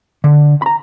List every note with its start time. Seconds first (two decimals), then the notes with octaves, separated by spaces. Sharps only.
0.24 D3
0.62 A#5 B5